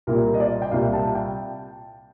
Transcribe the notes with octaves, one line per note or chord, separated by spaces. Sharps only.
C2 A#2 G3 A#4
D#5
D5
G5
C2 A#2 G3 F5
A5
G5